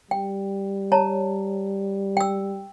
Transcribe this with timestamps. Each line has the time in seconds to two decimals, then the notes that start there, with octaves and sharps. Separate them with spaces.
0.11 G3 G5
0.92 C#5 A5 A#5
2.17 G5 E6